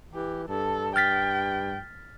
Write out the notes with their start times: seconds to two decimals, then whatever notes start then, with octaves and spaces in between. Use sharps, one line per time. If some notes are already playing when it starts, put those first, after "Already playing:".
0.14 E3 G4
0.48 G2 A4
0.96 G5 F6 A6 B6